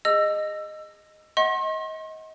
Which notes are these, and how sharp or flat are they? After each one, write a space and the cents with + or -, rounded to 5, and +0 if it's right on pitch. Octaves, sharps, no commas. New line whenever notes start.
G#4 -25 D#5 -10 E6 +20
D#5 +30 F#5 +0 C6 +45